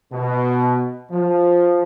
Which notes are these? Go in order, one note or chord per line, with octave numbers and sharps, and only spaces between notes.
B2
F3